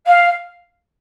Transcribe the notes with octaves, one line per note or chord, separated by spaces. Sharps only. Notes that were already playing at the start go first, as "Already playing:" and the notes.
F5